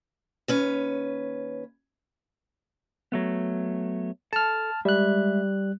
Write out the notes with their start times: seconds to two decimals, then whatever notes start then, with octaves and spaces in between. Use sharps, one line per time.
0.48 D#2 C#4 B4
3.12 F#3 A3 B3
4.33 A4 A5 F6
4.85 G3 G#3 E5 F#6